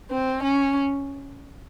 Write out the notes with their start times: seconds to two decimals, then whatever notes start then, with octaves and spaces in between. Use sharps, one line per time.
0.10 C4
0.43 C#4